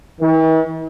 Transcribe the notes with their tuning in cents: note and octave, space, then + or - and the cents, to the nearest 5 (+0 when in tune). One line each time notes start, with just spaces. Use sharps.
E3 -45